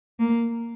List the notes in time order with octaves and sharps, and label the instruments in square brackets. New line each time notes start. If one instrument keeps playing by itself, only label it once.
[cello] A#3